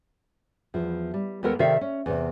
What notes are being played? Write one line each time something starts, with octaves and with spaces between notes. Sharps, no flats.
E2 F3
G3
D#2 G#3 B3 A4 A#4
C3 D#3 A4 D5 E5 F5
C#4
E2 C3